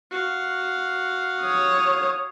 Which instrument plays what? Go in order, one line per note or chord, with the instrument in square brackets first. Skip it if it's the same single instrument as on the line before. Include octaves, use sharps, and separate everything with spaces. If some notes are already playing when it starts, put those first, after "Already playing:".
[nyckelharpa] F#4 F5
[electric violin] C#5 D#6